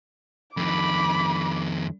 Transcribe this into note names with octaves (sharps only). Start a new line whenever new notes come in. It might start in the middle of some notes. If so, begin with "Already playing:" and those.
F2 D#3 B5 D6